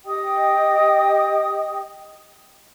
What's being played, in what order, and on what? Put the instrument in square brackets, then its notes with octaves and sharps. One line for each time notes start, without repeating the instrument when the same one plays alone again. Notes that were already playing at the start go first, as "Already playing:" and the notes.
[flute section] G4 D#5 G5 D#6